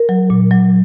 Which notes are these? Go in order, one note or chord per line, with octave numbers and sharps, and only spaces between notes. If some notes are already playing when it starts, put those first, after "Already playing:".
Already playing: A#4
F#3
A#2
F#3